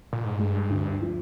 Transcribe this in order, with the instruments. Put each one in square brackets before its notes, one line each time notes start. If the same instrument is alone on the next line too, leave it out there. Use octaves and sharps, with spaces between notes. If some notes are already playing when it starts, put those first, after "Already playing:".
[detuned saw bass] A#2
G#2
[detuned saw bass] G2 [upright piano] G#3
[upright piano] D2
F3